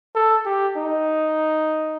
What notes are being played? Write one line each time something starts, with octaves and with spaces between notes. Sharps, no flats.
A4
G4
D#4